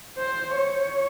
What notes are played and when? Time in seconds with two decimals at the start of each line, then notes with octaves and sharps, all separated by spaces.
0.17 C5
0.56 C#5